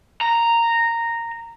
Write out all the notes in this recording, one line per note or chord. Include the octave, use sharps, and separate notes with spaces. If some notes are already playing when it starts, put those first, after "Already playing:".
A#5